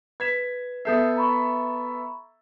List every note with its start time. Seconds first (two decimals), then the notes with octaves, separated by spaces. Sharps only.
0.20 B4 G#6 B6 E7
0.85 B3 A4 E5 D#6 G6 C7
1.17 A#5 B5 C#6